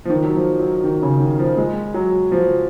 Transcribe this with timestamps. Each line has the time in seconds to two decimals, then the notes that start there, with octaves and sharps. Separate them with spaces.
0.05 F3
0.10 D#3
0.24 F#3
0.35 F3
0.59 F#3
0.84 D#3
1.02 C#3
1.20 D#3
1.39 F3
1.57 G#3
1.94 F#3
2.32 F3